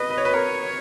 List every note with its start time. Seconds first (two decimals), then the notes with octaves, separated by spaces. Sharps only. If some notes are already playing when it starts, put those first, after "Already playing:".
Already playing: B4 D#5
0.10 B4
0.18 C#5
0.25 B4
0.33 A#4 C#5